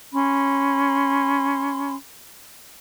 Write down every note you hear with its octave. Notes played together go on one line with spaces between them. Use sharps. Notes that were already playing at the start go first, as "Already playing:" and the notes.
C#4 B5 C6